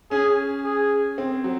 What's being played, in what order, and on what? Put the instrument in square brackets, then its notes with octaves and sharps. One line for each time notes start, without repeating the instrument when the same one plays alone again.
[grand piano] C#4 [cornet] G#4
[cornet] G#4
[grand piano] C4
F#3